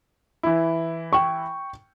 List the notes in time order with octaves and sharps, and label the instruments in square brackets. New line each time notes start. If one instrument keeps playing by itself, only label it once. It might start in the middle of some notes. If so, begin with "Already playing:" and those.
[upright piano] E3 E4
[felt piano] G5 C#6